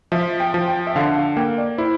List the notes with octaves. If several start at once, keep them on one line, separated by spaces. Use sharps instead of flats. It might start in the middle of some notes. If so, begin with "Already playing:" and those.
F3 E5
G5
F3
G5
E5
D3 F5
F5
A#3 G5
D5
E4 C5